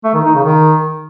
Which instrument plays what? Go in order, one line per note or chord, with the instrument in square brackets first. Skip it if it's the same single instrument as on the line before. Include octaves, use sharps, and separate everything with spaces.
[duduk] A3
D#3
D#4
C#3
D#3